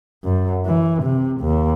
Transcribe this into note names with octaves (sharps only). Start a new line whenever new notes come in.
F#2
E3
C3
D#2